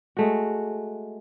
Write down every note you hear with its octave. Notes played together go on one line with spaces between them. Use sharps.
G#3 A3 F#4